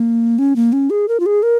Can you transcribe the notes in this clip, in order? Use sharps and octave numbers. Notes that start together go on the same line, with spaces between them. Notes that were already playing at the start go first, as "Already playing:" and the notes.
Already playing: A#3
C#4
A#3
C#4
G#4
A#4
F4
G#4
A#4